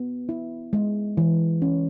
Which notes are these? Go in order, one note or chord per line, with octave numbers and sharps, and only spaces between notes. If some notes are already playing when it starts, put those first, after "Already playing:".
Already playing: B3
E4
G#3
E3
C#4